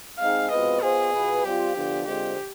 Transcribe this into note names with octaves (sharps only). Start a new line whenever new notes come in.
G#3 C4 D#4 G#4 F5
B2 G#3 C4 F4 B4 D#5
B3 F4 G#4 C5
B2 B3 F4 B4
G3 C4 F4 G4 C5
D3 F3 B3 D4 F4
D3 G#3 C4 F4 G4 C5